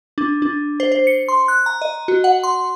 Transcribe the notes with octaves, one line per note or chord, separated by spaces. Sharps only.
D4
D4
C5
C5
C#7
C6
F#6
A#5
D#5
F#4
F#5
C6